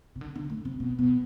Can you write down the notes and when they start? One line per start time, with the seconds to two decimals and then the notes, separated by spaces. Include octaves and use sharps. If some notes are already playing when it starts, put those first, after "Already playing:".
0.16 C3
0.21 D3
0.36 D3
0.50 A2
0.65 C3
0.80 B2
0.99 B2